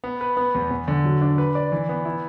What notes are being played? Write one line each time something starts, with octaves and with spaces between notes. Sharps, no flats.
B3
B4
B3
E2
E2
D3
F#3
D4
B4
D5
E3
B3
E4